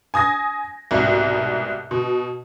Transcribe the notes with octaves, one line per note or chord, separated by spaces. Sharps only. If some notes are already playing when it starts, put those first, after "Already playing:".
G#5 D#6 G#6 A#6
C2 G#2 B2
B2